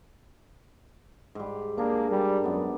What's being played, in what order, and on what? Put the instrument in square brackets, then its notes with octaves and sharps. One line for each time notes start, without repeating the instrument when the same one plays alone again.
[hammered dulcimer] G#2 G3
[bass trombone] A#3 [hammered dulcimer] D4 G#4 A#4
[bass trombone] G3
[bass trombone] F#2 [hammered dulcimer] B3 D5